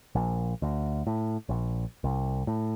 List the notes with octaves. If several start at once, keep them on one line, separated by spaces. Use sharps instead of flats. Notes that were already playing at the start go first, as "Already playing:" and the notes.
A#1
D2
A2
A#1
C2
A2